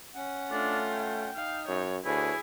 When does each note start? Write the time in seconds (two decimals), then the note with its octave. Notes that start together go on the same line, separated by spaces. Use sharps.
0.15 C#4 F#5
0.51 A3 D4 F4
0.92 G5
1.36 D#4 F5
1.68 F#2 C#5
2.05 D2 E4 G#4 B4 C#5